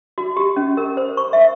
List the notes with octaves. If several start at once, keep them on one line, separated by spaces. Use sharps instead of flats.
F#4
G4
C#4
A#4
C5
C#6
E5